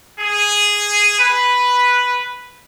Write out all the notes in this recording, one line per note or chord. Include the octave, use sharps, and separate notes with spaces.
G#4
B4